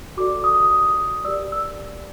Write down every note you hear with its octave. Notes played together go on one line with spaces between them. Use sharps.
F#4 A4 D5 D6
D#6
D#6
G4 A#4 D5 E6
E6